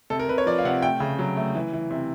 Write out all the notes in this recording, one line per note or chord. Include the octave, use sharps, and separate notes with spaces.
C3 A4
A#4
C3 B4
C#5
F3 D5
F5
C3 F#5
A3 G5
C#3
F#3
A3
E3
E3
C3